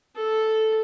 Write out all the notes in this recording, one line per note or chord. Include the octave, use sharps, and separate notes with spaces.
A4